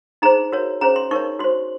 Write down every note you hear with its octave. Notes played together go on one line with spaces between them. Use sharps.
D#4 G#4 C5 A#5
F#4 A#4 C#5
C#4 G#4 C5 A#5
C6
D#4 A#4 C#5 C#6
F#4 C5 C6